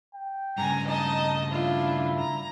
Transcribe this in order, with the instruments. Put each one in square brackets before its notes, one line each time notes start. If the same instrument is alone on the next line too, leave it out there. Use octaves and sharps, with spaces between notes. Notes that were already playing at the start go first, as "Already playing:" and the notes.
[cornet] G5
[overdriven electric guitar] G2 C#3 [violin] G#5 A#5
[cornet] D#4 [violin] D#5 A5
[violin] D4 F4 [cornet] E4
[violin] A#5